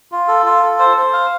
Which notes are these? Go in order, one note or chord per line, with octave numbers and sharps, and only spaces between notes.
F4
A4
F4
A4
C5
C5
F5